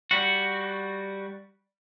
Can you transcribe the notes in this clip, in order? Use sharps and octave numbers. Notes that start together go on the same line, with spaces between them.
G3 F#4